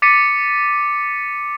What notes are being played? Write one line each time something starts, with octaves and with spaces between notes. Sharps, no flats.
D6 A6 B6 C#7 D#7